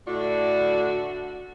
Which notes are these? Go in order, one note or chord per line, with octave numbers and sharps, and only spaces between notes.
A2 D3 D4 F#4 D5